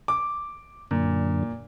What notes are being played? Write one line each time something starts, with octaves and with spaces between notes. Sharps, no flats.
D6
F#2 A#2 D3